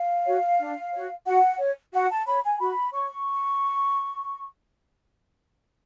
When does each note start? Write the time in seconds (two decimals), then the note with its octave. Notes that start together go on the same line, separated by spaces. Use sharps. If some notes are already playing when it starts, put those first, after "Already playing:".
Already playing: F5
0.26 F#4 C#5
0.59 D4
0.93 F#4 C#5
1.26 F#4 F#5
1.59 C#5
1.93 F#4 F#5
2.09 A5
2.26 C#5 B5
2.43 G#5
2.59 F#4 B5
2.93 C#5 C#6